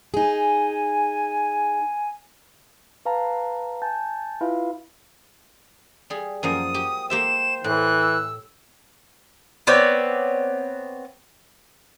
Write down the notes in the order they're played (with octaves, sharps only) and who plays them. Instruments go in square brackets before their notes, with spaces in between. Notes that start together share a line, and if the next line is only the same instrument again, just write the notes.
[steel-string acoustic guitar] D#4 G#4 [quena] G#5
[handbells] B4 F5 A5 A#5
G#5 A5 G6 A6
E4 F4 B4 E5 F5
[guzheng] G3 G#4
[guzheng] F#2 F3 A#3 [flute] D#6 [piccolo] D#7
[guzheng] G4
[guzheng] A#3 G4 E5 [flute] C5 [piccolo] E7
[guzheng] A2 [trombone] E3 [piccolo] F#6
[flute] E6
[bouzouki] B3 C4 C#5 D5